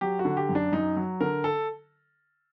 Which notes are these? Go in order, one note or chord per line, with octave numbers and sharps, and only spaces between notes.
F#3 G4
F#4
D3
G4
F#2
D4
F#2 D#4
F#3
D3 A#4
A4